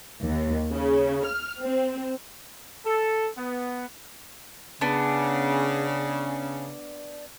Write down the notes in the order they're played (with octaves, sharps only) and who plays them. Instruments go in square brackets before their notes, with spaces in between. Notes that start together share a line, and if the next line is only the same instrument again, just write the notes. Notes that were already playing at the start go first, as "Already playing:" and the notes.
[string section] D#2
C#3
F6
C4
[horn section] A4
B3
[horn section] C#3 [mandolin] B3 D4